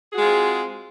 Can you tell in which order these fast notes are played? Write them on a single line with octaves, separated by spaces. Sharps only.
G#4 F#4 G#3 F4 C4